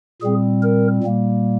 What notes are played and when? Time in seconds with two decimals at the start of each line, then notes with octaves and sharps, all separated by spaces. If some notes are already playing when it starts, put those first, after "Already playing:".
0.22 A#2 G3 C4 G#4
0.63 A#4
1.04 A#2 G3 A#3